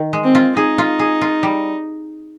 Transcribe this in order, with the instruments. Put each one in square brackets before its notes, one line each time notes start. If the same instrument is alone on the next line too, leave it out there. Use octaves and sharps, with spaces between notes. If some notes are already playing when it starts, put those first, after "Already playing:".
Already playing: [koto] D#3
G#3
[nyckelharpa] C4
[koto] F4
[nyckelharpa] D#4 [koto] G#4
[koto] F4
G#4
F4
G3